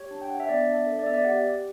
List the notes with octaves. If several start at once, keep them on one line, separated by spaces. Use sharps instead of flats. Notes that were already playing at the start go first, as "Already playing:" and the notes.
Already playing: G4 C#5
D4
G5
D4 F#5
E5
B3 D5
D4
E5
A4
D5
B3 E5
D5
G4 F#5
G4